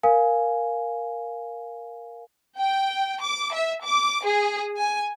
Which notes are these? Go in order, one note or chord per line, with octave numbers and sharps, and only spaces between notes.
A#4 F5 G#5
G5
D6
E5
D6
G#4
G#5